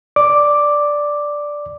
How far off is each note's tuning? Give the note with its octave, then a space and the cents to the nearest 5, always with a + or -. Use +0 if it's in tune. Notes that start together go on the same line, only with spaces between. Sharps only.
D5 +0 D6 +0